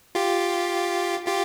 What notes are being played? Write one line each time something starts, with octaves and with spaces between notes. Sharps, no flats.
F4 G4
F4 G4